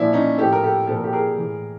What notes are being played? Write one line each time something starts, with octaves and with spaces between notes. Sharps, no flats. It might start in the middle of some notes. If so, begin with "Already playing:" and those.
Already playing: A#2 F3 D4 E4
C#4 D#4
A2 F3 G4 A4
A#4
G4 A4
A#2 F3 A4
A#4
G4 A4
G#4 A#4
A2 E3